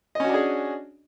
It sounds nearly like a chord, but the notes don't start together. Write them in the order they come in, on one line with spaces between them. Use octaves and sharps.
D#5 C#4 F#4 D4 G#4